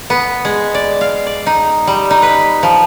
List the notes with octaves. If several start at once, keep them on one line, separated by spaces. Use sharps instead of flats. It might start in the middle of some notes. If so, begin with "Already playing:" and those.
B3
G#3
D5
F5
D5
D#4
G3
D#4
B4
F3